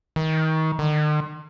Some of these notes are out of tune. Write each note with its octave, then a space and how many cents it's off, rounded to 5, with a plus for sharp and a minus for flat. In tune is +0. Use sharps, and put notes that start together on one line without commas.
D#3 +30
D#3 -45